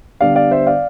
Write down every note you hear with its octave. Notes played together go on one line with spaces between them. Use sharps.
D3 G3 B3 D4 D5 F5
D5 F5
C5 E5
D5 F5